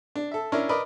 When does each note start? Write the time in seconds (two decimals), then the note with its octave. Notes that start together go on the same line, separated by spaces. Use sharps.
0.16 D4
0.31 A4 E5
0.52 C#4 D4 E4 A#4 D5
0.69 A#4 B4 D5 D#5 B5